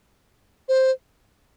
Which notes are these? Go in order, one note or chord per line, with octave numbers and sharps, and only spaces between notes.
C5